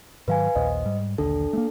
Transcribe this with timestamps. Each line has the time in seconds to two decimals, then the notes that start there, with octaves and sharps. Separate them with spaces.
0.28 G#2 D#3 F#3 B4 F5 G#5
0.55 A#1 D#2 A#2 C5 D#5
0.85 G#2 G3
1.18 A#1 D#2 D3 D4 A4
1.53 A3 A#3